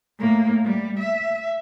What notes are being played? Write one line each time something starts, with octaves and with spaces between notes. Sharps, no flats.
A2 A#3
G3
E5